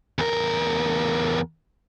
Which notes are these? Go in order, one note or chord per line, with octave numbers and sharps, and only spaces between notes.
E2 A#4